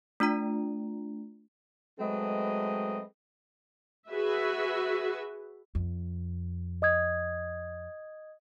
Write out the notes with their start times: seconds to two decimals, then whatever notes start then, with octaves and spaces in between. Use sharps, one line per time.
0.20 A3 D4 F4 A#5
2.00 F#3 G#3 A3 C4 B4 D#5
4.09 F#4 G#4 B4 E5
5.75 F2
6.82 D#5 D#6 G#6